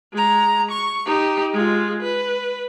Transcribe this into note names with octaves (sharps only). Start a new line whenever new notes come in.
G#3 A#5
C#6
D#4 G4
G#3 F4
B4